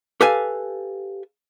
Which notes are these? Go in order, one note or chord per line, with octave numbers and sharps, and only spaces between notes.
G4 A4 B4 F5 G#5